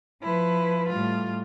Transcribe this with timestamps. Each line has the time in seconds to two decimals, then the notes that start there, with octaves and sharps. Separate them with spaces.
0.22 F3 E4 B4
0.89 A2 G3 F4